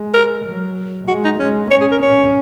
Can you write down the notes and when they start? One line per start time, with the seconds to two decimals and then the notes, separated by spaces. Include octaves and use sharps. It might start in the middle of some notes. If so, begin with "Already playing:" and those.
Already playing: G#3
0.14 A#4
0.45 F#3
1.08 G#3 F#4
1.24 D#4
1.39 G#3 C#4
1.71 C#4 C#5
1.81 G#4
1.91 A#4
2.02 C#4 C#5